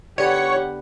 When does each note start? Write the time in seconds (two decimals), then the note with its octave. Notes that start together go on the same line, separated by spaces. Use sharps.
0.18 D3 B3 G4 C#5 F#5